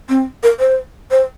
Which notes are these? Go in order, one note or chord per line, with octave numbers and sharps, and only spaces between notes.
C4
A#4
C5
C5